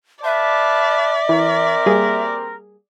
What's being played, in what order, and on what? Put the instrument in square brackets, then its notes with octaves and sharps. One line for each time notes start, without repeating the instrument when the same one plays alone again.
[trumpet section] B4 F5 A5 [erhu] D5 [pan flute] E5
[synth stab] E3 [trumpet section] C4 A#4
[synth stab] G3 A#3 G#4